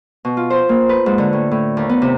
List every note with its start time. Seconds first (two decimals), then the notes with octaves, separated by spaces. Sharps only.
0.25 B2
0.37 F4
0.50 C5
0.69 A#3
0.89 B4
1.06 G#2
1.18 D3
1.33 A2
1.51 A2
1.77 D#2
1.89 B3
2.02 C3